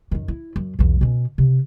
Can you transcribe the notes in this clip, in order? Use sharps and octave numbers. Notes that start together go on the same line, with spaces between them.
F#2 D#3
E4
F#2
B1 E2
B2 C#4
C3